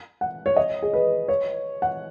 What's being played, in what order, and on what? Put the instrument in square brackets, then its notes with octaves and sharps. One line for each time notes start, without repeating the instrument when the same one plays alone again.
[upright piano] F#5
C#5
D#5
G#4
B4
C#5
F#5